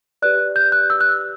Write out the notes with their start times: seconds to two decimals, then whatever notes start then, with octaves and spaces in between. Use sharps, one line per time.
0.22 G4 B4 D5 F#6
0.56 G6
0.72 F#6
0.90 E6
1.01 F#6